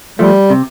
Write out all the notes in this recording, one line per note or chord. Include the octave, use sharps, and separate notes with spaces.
F3 G3 A3
C3